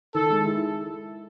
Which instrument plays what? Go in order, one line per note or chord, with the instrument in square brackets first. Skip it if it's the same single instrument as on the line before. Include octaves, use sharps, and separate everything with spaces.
[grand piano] D#3 [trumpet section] A4
[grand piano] G#3
E4